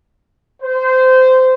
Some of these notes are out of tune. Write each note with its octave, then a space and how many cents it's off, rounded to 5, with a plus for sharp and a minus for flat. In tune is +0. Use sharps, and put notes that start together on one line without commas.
C5 -20